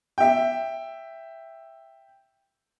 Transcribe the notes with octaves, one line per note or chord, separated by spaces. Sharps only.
E5 G5